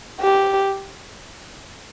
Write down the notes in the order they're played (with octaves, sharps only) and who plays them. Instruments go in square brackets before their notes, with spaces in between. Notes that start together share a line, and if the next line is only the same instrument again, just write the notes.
[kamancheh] G4